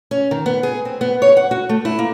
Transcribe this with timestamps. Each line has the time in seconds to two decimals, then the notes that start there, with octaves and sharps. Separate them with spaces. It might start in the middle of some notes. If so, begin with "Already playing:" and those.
0.11 C#4
0.31 D#3
0.46 B3
0.63 G#4
0.85 C4
1.01 B3
1.22 C#5
1.37 F#5
1.51 F#4
1.69 A3
1.85 E4
1.99 A#3